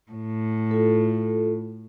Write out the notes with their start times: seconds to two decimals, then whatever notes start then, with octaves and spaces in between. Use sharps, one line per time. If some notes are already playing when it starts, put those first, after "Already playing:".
0.11 A2
0.71 F4 A4